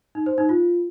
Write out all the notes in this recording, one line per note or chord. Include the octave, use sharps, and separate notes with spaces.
D#4
C5
D#4
F4